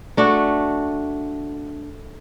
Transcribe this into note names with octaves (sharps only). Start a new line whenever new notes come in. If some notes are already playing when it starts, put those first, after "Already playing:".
A3 D4 F#4